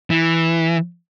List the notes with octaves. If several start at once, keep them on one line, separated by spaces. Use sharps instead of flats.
E3